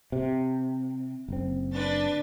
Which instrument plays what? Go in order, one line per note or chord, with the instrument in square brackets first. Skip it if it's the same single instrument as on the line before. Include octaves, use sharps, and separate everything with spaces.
[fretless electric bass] C3
F#1 C4
[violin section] D4 B4 A6